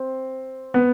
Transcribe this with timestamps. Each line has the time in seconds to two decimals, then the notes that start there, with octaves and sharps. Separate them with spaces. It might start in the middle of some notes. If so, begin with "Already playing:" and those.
Already playing: C4
0.74 B3